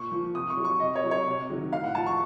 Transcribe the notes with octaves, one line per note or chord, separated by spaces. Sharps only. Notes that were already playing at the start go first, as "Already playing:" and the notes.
Already playing: A#2 C#6
F3
C3 D#6
C#6
F#3
C#6
C3 D#5
C#5
F#3
C#5
C3
D#3 F#3
A2 F5
F#5
F3 A5
C#6